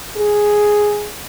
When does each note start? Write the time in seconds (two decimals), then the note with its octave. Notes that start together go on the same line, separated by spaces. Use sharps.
0.17 G#4